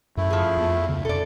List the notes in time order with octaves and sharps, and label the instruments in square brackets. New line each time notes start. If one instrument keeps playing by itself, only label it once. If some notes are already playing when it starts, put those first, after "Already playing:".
[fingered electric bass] F#2 [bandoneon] A3 E4
[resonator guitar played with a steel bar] F3 G#4
[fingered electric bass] F2 B3
D2 C#3
[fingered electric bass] F2 B2 [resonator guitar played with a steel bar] A4 D5